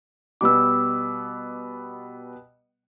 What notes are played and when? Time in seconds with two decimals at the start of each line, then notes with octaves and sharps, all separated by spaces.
0.41 B2 G3 B3 D6 E6